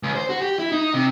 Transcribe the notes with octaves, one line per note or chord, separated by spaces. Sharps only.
C#2
C5
F#4
G4
E4
D#4
C3